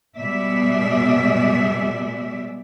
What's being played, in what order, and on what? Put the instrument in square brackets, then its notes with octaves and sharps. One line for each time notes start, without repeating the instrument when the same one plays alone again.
[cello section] F#2 B2 G3 G#3 D5 E5